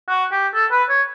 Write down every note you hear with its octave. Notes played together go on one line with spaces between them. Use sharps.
F#4
G4
A4
B4
C#5